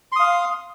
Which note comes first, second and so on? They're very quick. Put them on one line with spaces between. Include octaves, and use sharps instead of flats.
C6 D#6 F5